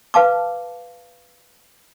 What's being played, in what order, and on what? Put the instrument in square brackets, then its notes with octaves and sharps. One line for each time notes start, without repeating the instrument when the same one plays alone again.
[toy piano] B4 F5 A5 D6